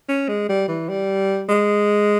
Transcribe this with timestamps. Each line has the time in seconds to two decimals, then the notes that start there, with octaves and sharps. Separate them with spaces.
0.09 C#4
0.28 G#3
0.49 G3
0.68 E3
0.89 G3
1.49 G#3